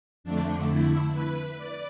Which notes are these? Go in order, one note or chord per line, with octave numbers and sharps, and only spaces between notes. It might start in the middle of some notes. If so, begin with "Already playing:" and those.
F2 D3 A3 D4
E4
B4
D5